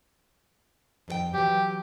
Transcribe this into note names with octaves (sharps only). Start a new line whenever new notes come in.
F2 A4 G5
E3 F#3 G4